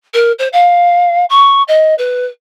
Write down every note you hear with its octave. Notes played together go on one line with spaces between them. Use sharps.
A#4
C5
F5
C#6
D#5
B4